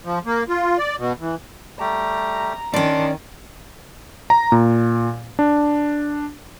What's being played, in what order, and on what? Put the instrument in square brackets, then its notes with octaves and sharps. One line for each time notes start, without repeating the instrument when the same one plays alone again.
[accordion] F3
A#3
F4
D5
B2
E3
[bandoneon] G3 A3 G4 [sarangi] A#5
[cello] D#3 [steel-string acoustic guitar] C#4 D5 [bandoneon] D4 C6 D6
[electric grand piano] A#5
A#2
D4